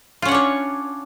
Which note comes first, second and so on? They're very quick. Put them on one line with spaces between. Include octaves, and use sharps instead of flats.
F4 C#4 F#5 D4 C#5